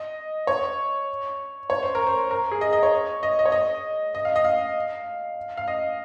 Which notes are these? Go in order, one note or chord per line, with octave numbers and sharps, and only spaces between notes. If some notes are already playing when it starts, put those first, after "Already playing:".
Already playing: D#5
C#5
C#5
C5
A#4
C5
A#4
G#4
D#5
D#5
C#5
D#5
D#5
C#5
D#5
D#5
F5
D#5
F5
F5
D#5